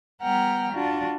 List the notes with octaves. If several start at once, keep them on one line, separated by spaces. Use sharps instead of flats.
G3 B3 F#5 G5 A#5 F6
D4 F4 F#4